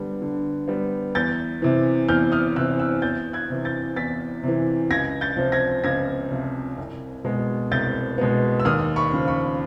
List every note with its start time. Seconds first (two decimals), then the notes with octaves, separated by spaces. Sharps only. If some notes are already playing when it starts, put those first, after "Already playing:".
Already playing: D3 G3 B3
0.22 D3
0.68 G3 B3
1.15 E2 G6 A6
1.62 C3 E3
2.08 E2 F6 G6
2.32 D#6 F6
2.56 C3 E3 E6 F#6
2.79 E6 F#6
3.02 E2 G6 A6
3.33 F#6 G#6
3.50 C3 E3
3.65 G6 A6
3.96 E2 A6 B6
4.43 C3 E3
4.90 C#2 G#6 A#6
5.21 G6 A6
5.37 C3 F3
5.52 G#6 A#6
5.84 C#2 G#6 A#6
6.31 C3 F3
6.78 C2
7.24 B2 G#3 B3
7.71 C2 G6 A6
8.18 B2 G#3 B3
8.60 E6
8.65 D#2 D#6 F6
8.96 B5 C#6
9.13 C#3 F3
9.28 B5 C#6